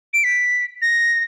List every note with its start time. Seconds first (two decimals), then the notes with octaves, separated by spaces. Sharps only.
0.14 D7
0.24 B6
0.82 A#6